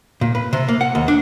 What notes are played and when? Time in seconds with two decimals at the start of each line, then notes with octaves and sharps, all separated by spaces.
0.21 A#2
0.35 B4
0.53 C3
0.69 A#3
0.81 F#5
0.95 D#2
1.08 D4